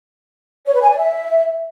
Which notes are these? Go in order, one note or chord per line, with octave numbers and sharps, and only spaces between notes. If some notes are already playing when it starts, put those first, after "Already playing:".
C#5
B4
G#5
D5
E5